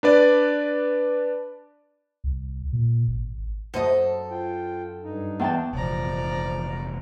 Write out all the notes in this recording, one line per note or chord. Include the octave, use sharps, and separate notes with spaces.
D4 B4 D5
C2
A#2
G#1
F#2 A4 C5 D#5
F4 G5
G2 D#4
E2 G5 A5
F1 A#1 E2 F3 D5 A#5